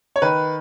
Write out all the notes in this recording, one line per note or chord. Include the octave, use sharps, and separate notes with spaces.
C#5
D#3 B4